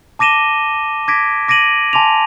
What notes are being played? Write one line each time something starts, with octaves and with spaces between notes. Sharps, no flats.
A5 D6 A#6 D#7 E7 G7
D6 G#6 A#6 B6 D7
D6 A#6 D7 D#7 F#7
G#5 A5 C6 D6 F7